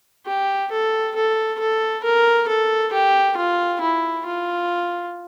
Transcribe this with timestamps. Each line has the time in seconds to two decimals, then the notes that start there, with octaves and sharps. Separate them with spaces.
0.26 G4
0.71 A4
1.15 A4
1.60 A4
2.04 A#4
2.48 A4
2.93 G4
3.37 F4
3.81 E4
4.26 F4